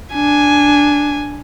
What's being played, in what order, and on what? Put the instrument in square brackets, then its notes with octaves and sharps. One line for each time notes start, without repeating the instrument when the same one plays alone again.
[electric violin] D4 G#5